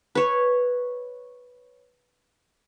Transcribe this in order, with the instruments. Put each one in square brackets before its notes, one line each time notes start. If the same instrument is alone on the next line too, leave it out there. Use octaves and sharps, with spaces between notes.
[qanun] B4 C#5